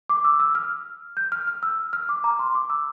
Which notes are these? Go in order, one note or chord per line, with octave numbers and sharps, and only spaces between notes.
D6
E6
E6
F6
G6
F6
F6
E6
F6
D6
A#5
C6
D6
E6